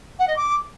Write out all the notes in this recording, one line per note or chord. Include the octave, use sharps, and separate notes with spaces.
F#5
D#5
D6